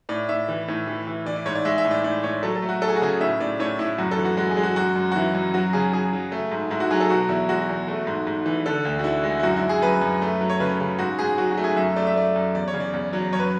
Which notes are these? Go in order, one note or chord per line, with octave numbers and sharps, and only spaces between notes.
A2 D5
A2 E5
E3
A2
E3
E3
E3 D5
D5
G#2 C#5
D5
G#3 E5
E5
A2
D5
A2 D5
A2 C#5
F#3 A4
A4
A3
F#4
A3 A4
G#4
F#4
C#3 G#4
A2 E5
A2 D5
A2 C#5
A2 E4
F#2 F#4
A4
E3
F#4
G#3 F#4
G#4
G#3
F#4
F#2 F#4
F#2
F#4
E3 E4
F#2
F#3 F#4
C#3 G#4
F#3 G#4
F#3
A3
G#2
G#2 E4
F#4
F#3 G#4
A4
B2 F#4
E2 E4
G#3 F#4
E2
A3
G#2
G#2
E3
D3 A4
D2
F#4
D3 E4
G#3
E4
F#2 F#4
E4
F#2
G#4
F#2 B4
F#2
A3
F#3
C#5
C#3 B4
C#3
G#2 F#4
G#2 G#4
F#3 F#4
F#4
A3
G#4
F#2 E5
A3 D5
E5
A3 D5
F#2
E2 D5
C#5
C#3
D5
E2
F#3
F#2 C#5
B4